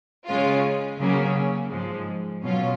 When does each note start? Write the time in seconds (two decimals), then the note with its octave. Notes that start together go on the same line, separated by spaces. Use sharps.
0.27 C#3 G#3 C#4 F4
0.99 C#3 F#3 A#3 C#4
1.70 G#2 F3 G#3
2.41 B2 F#3 C#4 F4